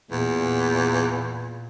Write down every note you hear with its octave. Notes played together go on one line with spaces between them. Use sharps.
E2 A#2